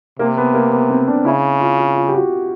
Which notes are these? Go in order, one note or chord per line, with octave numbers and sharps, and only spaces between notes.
C3 A#3
B3
A#3
B3
C4
D4
C#3 E4
F4
F4
F4
G4
F#4